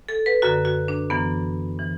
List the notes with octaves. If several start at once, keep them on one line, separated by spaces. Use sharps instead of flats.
A4
B4
F#2 D3 F#4
F#4
D4
F#2 E3 B3
E3